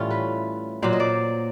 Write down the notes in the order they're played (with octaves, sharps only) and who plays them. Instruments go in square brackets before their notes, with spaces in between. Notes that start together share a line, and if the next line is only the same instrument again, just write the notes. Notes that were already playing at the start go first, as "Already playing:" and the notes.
Already playing: [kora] A2 E3 G3 C#4 F4
B4
A#2 F#3 C5
D#5
D5